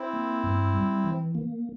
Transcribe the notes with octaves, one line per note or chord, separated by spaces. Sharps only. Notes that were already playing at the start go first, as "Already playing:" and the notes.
Already playing: C4 E4
A#3
G2
G3
E3
A#3